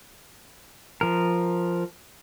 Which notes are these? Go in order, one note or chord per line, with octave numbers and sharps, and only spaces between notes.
F3 A#4